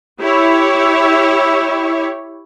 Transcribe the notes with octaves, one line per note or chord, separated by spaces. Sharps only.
E4 G4 C#5